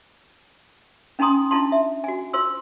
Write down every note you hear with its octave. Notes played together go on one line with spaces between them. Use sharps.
C#4 D#4 G#5 A#5 C6 D#6
D4 E4 F4 A5 C6
E5
F#4 G#5
F4 C5 C6 E6